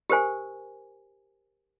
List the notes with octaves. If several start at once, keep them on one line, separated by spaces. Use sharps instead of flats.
G4 A#4 C5 G#5